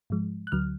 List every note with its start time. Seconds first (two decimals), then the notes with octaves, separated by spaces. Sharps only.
0.10 G#2 F3 G#3
0.47 F#6
0.52 D2 D3 F#3 F6